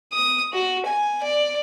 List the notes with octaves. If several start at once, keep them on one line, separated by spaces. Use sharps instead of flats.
D#6
F#4
G#5
D5